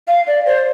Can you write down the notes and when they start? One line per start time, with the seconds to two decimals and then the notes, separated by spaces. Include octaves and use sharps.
0.08 F5
0.27 D5
0.46 C5